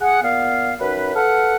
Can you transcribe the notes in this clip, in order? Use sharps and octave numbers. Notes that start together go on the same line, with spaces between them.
G#4 F#5
A#2 B3 F5
F#2 D#4 B4
A4 B4 F5 F#5